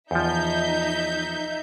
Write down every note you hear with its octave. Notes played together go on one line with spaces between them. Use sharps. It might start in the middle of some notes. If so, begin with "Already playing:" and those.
E2 F3 D#4 E5 G6